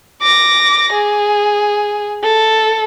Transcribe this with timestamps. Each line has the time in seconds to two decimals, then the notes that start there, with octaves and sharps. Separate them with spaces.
0.22 D6 A#6
0.92 G#4
2.23 A4